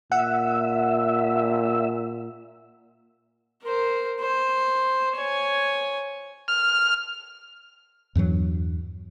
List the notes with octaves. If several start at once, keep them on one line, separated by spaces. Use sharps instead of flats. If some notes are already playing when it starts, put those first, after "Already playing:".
A#2 E5 F#5
A#4 C5
C5
C#5 G#5
F6
E2 G2 E3 F#3